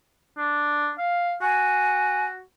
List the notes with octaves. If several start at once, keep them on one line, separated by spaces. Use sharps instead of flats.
D4
F5
F#4 G#5